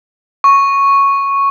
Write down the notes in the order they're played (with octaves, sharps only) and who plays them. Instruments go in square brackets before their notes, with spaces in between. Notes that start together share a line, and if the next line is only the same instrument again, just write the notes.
[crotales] C#6